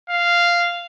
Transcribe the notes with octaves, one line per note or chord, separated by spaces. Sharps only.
F5